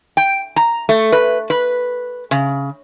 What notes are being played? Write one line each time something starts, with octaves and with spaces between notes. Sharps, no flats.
G5
A#5
A3
B4
B4
C#3